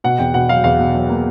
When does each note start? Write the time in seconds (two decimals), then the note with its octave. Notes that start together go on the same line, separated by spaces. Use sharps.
0.04 B2 F#5
0.19 E2 G5
0.34 B2 F#5
0.49 F#3 F5
0.64 E2 F5
0.79 B2
0.94 F#3
1.09 A#3